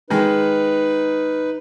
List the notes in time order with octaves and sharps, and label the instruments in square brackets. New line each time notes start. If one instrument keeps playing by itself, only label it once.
[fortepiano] D#3 G#3 [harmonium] D#4 B4